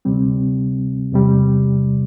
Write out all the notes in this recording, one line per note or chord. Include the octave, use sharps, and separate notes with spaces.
D2 C3 G3 C4
E2 C3 G3